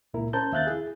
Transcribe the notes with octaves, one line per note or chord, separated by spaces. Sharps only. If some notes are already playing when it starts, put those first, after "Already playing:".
C#2 A#2 E4 A#4
C#4 A#4 C5 A5 G6
D#2 E5 F5 F#6 G6 A6
E4 G#4